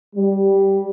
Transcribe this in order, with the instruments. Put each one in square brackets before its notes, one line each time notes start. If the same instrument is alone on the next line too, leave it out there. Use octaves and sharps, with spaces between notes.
[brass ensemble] G3